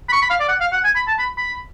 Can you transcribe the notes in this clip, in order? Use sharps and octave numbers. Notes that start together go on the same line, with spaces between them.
B5
C#6
B5
F5
D5
F#5
F5
F#5
G#5
B5
A5
B5
B5